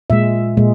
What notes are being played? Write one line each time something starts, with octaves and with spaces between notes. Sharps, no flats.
A#2 G#3 E5
A#2 G#3